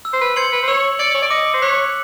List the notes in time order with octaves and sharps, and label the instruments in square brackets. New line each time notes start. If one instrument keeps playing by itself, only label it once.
[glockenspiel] E6
[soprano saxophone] C5
B4
[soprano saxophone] C5 [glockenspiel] G#6 C#7 F#7
[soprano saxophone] B4
C5
[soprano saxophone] C#5 [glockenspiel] E6
[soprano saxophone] D5 [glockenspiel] G#6 C#7 F#7
[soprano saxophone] C#5
D5
[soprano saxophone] D#5 [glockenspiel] D6
[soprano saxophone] C5
[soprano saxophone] C#5 [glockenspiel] F#6 B6